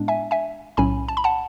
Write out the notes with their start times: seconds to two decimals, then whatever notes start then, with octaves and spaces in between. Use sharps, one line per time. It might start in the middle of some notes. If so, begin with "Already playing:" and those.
Already playing: A2 G#3 B3 D4
0.08 E5 G#5
0.31 E5 G#5
0.77 B1 A2 F#3 C#4 G#5 B5
1.08 A5
1.17 B5
1.24 F#5 A5